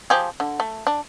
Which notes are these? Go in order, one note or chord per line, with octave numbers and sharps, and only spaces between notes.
F3 G4 G#4
D3
A3
D4